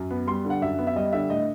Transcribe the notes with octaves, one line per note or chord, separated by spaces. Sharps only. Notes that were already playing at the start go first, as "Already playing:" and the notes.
Already playing: F#2
B3
G3 C6
D3
F#5
F#2 E5
B3
E5
G3 D#5
D3 E5
A2 D#5